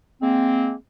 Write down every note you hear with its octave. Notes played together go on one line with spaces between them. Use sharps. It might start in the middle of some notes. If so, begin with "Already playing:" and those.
G#3 A#3 C4